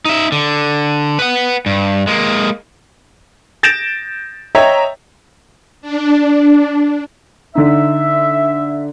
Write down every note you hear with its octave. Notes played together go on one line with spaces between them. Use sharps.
D#4 E5
D3
B4 F#5
G2
G#3 A#3
G6 A6 A#6 D7 E7
C#5 D#5 E5 G5 A#5
D4
D3 D#4 E5